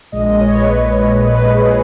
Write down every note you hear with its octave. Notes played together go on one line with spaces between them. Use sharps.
A#1 A#2 G#3 D#5
D#5
C#5
B4
C#5
B4
G#4